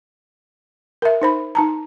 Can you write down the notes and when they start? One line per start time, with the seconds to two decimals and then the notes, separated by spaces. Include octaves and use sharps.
1.02 A#4 E5
1.22 D#4 C5 B5
1.55 D#4 A5 A#5